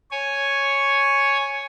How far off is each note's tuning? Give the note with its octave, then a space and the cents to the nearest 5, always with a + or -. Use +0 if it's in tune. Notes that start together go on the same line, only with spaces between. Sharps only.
C#5 +0 G#5 +0